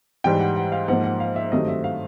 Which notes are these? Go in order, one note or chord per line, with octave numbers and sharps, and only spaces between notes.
G#2 E3 G3 G5
F#5
F#5
F5
G#2 F3 A#3 F#5
F#5
F5
E5
G2 D#3 F#3 A3 C4 D#5
E5
F5